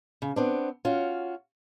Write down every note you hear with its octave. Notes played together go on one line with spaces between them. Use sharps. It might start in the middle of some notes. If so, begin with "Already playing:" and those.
C#3
B3 C4 D4
C#4 F4 F#4